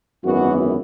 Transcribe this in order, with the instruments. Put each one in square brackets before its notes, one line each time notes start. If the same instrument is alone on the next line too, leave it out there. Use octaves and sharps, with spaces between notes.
[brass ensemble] G#1 F#2 E3 B3 F#4